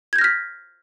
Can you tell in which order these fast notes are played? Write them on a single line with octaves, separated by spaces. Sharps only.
G#6 G6 A#6 F6 B6